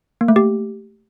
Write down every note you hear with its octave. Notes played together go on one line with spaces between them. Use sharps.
A#3
A3
G4